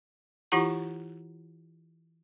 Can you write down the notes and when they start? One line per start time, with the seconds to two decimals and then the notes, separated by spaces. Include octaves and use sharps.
0.52 E3 E4 F4 G4 F#5 A#5